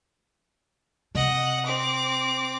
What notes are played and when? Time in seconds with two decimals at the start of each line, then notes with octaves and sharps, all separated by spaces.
1.15 C3 D#5 F#5
1.66 C4 D6